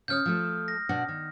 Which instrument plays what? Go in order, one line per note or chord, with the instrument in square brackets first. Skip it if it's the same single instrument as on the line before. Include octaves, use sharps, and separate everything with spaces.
[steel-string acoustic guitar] C#3 C#5 [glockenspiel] D#6 F6 G6
[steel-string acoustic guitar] F3 A3 A4
[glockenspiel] A#6
[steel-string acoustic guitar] B2 D4 F#5
D#3